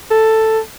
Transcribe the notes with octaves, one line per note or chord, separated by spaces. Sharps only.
A4